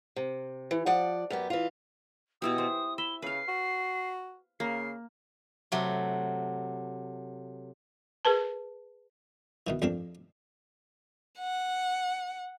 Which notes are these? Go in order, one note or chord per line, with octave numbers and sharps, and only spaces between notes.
C3
E3
F3 D5 F#5
F#2 B3 G4
E3 F4
B2 E3 E4 G4 D#6
C5
E4 E5 G7
C#3 B4 F5 C7
F#4
C#3 A#3 C7
C3 F#3 A3
G#4 A#4 B4 A5
B2 D#3 E3
F2 F3 A#3 C4 D4
F#5